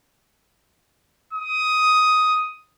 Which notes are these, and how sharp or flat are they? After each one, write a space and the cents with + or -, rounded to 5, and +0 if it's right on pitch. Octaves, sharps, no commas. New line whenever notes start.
D#6 +10